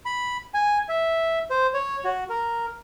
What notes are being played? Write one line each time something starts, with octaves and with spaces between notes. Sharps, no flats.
B5
G#5
E5
C5
C#5
F#4
A#4